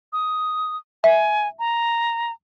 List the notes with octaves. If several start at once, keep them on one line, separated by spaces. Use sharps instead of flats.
D#6
E5 G#5
A#5